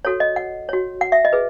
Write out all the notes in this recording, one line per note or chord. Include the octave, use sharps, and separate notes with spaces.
F#4 A4 C#5
D#5
F#5
F#4 C#5
F#5
E5
D#5
G#4 B4